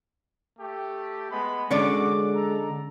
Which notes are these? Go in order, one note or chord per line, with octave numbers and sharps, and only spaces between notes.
A3 G4
G#3 B3 B5
D3 G#3 C#4 F#4 D5 D6
A4 A#5